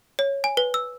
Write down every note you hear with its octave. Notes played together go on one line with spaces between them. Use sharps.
C#5
G#5
B4
E6